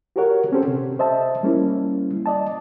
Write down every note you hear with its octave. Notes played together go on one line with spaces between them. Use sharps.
F#4 G4 A4 A#4 C#5 F#5
C4 C#4 G4 A4 C5
C3
C5 D#5 E5 A5
G3 A#3 C#4 E4
D5 D#5 A5